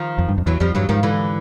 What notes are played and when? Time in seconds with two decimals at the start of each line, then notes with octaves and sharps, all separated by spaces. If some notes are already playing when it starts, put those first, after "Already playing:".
Already playing: D#3 F3
0.18 F2
0.28 G2
0.38 F2
0.46 E2 E3 F#3
0.60 F2 F3 G3
0.74 G2 E3 F#3
0.89 G#2 D#3 F3
1.03 D3 E3